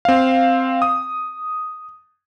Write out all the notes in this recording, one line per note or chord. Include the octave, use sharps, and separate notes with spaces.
C4 F5
D#6